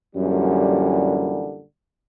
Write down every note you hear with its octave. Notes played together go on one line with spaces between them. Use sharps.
F#2 A#2 D3 E3 G3